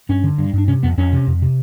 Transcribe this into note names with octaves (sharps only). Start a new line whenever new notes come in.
G2 C#4
D3
G2
G2 D4
C3 C#4
F2 B3
F2 C#4
C3
F2
C3